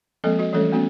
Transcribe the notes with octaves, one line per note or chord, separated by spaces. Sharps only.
F3 G#3 A#3 C4 A4 D#5
F#4 D#5
E3 G3 A3 C#4 A4 C#5
A3 B3 C#4 F#4